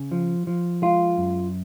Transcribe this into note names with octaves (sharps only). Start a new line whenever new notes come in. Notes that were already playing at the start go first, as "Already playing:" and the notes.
Already playing: C#3
F3
F3
G#3 F4
F#2